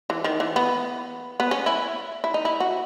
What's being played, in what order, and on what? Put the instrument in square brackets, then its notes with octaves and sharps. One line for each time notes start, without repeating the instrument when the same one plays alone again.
[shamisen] E3
D#3
E3
B3
B3
C#4
E4
E4
D#4
E4
F#4